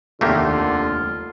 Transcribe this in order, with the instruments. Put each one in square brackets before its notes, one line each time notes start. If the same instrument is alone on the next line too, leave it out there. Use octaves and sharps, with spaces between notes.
[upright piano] F1 D#2 [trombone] D3 [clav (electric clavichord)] A3 A#3 G4 [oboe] F4